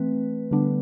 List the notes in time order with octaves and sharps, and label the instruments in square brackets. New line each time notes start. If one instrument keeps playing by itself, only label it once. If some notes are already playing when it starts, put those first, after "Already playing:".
Already playing: [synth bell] E3 A3 C4 B4
D3 G3 B3 D4